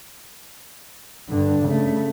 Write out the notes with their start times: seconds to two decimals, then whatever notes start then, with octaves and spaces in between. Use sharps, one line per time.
1.29 G2 D3
1.65 C#3 A3